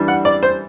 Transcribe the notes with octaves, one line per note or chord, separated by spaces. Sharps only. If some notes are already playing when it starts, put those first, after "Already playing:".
Already playing: E3 G3 D4
F#5
D5
C5